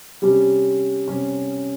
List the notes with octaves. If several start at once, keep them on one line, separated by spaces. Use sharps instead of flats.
C3 G3 C#4
C3 G3 C#4